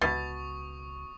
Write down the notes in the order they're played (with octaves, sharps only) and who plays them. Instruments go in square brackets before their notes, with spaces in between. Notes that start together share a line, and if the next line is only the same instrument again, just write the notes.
[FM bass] C#2 [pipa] B2 [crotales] C#6 D#6 [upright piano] A6